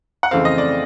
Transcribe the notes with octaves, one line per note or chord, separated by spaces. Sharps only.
F#5
F2 C#3 E3 A3 C4 F5
D#5
D5